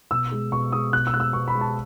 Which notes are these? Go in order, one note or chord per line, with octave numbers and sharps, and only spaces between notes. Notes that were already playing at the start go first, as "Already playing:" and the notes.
B2 E6
G#3
B2 C#6
G#3 D#6
B2 F#6
E6
G#3 F#6
E6
B2 C#6
B5
G#3
A5